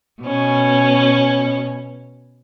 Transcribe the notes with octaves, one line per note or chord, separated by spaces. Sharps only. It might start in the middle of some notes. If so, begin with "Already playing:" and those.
B2 C#4